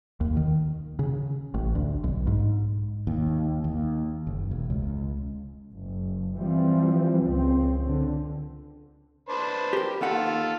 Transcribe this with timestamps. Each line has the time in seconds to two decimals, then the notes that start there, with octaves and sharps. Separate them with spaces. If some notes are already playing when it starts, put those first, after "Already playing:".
0.21 D#2
0.37 D#3
0.99 C#3
1.54 A1
1.75 D2
2.04 B1
2.27 G#2
3.07 D#2
3.64 D#2
4.27 F#1
4.51 E1
4.70 C#2
5.71 F#1
6.37 E3 F3 G3 C4
7.24 C#2 C4
7.87 D3
9.29 D4 B4 C5
9.73 G4 A#4
10.01 D#2 D#3 F4 A4 F#5